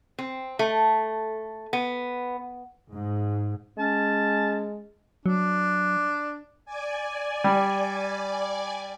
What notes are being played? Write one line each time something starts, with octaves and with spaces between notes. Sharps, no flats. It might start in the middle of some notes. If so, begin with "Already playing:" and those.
C4
A3
B3
G#2
G#3 C#4 A5
F#3 D4
D5 G#5
G3